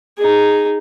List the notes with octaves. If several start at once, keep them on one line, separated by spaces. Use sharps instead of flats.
D#4 G#4